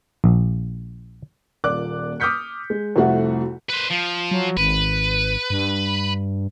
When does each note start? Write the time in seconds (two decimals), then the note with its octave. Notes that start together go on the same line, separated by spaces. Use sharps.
0.24 A#1
1.64 D#1 A#2 A#3 D5 D6 F#6
2.20 D6 D#6 F6 G6 B6 C#7
2.70 G#3
2.96 C2 F2 A3 F#4 F#5
3.69 B4 C5
3.90 F3
4.31 F#3
4.57 G#1 B4
5.50 G2